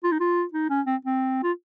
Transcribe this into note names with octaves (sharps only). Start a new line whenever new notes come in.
F4
D#4
F4
D#4
C#4
C4
C4
F4